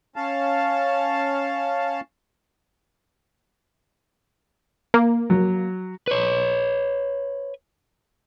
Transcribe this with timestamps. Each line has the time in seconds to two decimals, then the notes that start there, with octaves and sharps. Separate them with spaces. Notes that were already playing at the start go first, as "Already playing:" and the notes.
0.16 C#4 F5 A5
4.94 A#3
5.30 F#3
6.08 B4 C#5